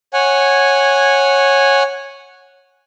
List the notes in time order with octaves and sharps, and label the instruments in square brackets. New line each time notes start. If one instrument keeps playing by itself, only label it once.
[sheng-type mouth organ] C#5 F#5 G#5